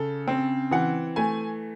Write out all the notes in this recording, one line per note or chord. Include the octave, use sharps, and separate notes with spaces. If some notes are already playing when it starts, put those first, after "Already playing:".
Already playing: C#3 A4
C4
E3 F#5
A3 G#5